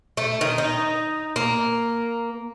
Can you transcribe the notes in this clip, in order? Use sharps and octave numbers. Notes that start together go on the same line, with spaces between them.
A3
D#3
D#4
A#3